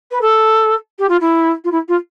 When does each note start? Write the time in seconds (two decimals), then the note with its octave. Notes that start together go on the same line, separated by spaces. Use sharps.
0.11 B4
0.21 A4
0.99 G4
1.09 F4
1.20 E4
1.64 F4
1.71 E4
1.88 F4